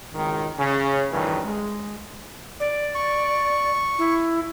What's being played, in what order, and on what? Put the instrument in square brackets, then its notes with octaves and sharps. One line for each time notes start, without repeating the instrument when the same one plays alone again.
[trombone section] G#1 C#2 D#3
C#3 C#4
D2 G2 D#3 E3 C#4
G#3
[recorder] D5
[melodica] C#6
[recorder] E4